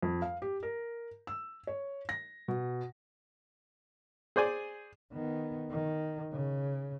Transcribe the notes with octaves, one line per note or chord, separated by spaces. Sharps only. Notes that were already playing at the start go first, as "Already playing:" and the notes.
F2
F5
G4
A#4
E6
C#5
A#6
B2
G#4 C5 D5 G#5
D#3 B3
D#3
C#3